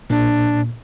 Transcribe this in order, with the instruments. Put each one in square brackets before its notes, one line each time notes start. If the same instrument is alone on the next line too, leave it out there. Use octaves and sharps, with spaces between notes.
[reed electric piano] A#2 [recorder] D4